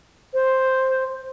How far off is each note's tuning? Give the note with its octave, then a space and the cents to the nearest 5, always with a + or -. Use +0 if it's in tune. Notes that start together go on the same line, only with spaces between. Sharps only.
C5 +5